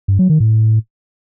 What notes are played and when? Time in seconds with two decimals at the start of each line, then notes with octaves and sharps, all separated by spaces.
0.08 G2
0.19 F#3
0.30 D#3
0.40 A2